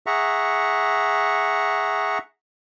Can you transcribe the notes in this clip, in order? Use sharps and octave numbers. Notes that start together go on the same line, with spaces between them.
G#4 E5 F#5 A#5 C#6